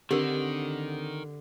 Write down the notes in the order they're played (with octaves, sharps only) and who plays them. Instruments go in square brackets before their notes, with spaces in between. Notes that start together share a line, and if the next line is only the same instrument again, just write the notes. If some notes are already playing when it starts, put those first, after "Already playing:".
[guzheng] D3 [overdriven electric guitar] D#3 [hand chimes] C4 [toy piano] G4 A#4